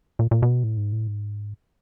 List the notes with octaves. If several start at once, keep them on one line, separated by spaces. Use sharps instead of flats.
A#2
A#2
B2
A2
G#2
A2
G#2